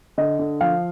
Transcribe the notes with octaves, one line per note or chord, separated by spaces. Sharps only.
D3 D#5
D3
F3 F5